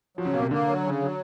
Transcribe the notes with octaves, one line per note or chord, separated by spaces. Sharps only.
F3 F#3
C#3
B2 A#3
C3
D3 A#3
F#3
C#3
F#3